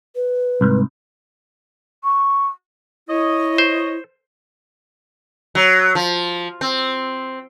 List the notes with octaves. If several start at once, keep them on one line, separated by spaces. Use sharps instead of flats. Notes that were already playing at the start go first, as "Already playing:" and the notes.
B4
C2 G#2
C#6
E4 C#5 D#5
C5
F#3
F3
C4